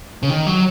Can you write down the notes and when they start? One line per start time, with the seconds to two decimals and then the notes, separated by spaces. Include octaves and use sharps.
0.23 C#3
0.30 D#3
0.47 F#3